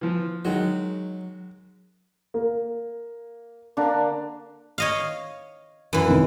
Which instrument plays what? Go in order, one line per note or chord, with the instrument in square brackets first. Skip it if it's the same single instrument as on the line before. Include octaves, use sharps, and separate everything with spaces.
[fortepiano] E3 F3
[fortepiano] D#3 G#3 F#4 [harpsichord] F#3
[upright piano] A#3
[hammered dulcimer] D3 A#3 D4
[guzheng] C#5 D#5 F5
F#2 E3
[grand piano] A1 C3 D#3